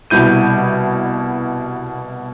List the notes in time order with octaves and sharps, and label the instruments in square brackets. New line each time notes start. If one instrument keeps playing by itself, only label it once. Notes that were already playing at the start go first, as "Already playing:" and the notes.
[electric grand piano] C2 B2 G3 E4 G6 D#7